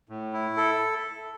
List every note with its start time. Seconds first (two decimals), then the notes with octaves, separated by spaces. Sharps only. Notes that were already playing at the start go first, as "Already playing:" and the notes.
0.09 A2
0.33 E4
0.57 A4